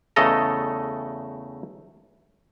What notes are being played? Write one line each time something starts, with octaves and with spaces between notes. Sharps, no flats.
E2 C#3 A3 A4 D#5 A#5